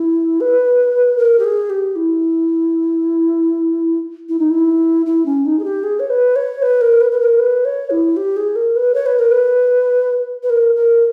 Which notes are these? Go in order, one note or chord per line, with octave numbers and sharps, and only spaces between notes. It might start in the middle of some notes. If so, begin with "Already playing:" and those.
Already playing: E4
B4
A#4
G4
G#4
G4
E4
E4
D#4
E4
E4
C#4
D#4
G#4
G4
G#4
C#5
B4
C#5
B4
A#4
B4
B4
A#4
B4
C#5
E4
G4
G#4
A#4
B4
C#5
B4
A#4
B4
B4
A#4
A#4